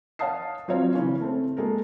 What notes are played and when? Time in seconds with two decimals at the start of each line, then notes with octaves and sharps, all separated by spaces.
0.19 C#5 F5 F#5 A5 D#6 C7
0.68 F#3 C4 F4 C#5 F5
0.95 C#3 E3 C#4
1.21 A3 C4
1.57 G#3 A#3 A4 A#4